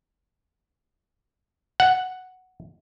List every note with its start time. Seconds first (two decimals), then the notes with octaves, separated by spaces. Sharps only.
1.80 F#5